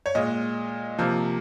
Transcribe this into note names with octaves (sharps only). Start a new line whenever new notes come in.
C#5
A#2 G#3 D#5
C3 F3 A#3